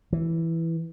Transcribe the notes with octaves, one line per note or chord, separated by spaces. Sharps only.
E3